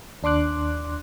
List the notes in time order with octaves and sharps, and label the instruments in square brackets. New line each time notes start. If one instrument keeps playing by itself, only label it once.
[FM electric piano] D#2 D4 C6 D6 F#6